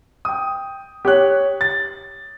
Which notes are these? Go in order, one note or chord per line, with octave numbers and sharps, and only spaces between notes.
G5 D#6
G4 C#5 F#6
A6